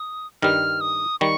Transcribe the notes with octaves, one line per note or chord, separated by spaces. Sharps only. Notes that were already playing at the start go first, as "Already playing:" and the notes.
Already playing: D#6
G2 D#3 G3 F6
D#6
D#3 G3 C#6